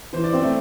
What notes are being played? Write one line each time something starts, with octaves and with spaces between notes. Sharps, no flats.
E3 C5
D5
C4 C5
A3